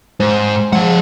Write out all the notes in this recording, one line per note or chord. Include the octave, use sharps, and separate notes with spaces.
G#2 C5
F3 G#3 F#5